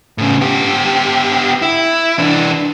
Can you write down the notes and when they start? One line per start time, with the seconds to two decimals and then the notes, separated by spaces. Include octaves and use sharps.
0.18 A2 C#3
0.41 B3 G4
1.62 E4
2.19 E3 D4